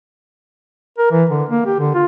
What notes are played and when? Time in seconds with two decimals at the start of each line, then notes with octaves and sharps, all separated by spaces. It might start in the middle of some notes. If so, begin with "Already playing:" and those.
0.98 A#4
1.11 E3
1.30 D3
1.49 A#3
1.66 G4
1.79 D3
1.94 F4